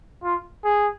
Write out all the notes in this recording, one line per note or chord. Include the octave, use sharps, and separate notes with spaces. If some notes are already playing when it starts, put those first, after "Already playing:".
F4
G#4